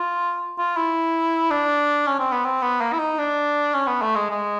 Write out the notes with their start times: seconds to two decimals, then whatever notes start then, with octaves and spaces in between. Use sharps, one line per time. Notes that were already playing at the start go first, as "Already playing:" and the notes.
Already playing: F4
0.59 F4
0.77 E4
1.51 D4
2.07 C#4
2.19 C4
2.32 B3
2.45 C4
2.62 B3
2.81 A#3
2.93 E4
2.99 D#4
3.18 D4
3.74 C#4
3.87 B3
4.02 A3
4.15 G#3
4.30 G#3